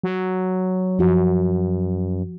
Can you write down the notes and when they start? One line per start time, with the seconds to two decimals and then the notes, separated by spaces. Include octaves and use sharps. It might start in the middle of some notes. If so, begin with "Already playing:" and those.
0.03 F#3
0.99 F#2 F3 F#4